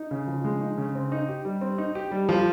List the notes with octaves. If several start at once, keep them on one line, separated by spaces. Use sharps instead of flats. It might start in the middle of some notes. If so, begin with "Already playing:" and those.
Already playing: D#4
C#3
F3
G#3
D#4
C#3
C4
D#4
G4
G3
C4
D#4
G4
G3
F3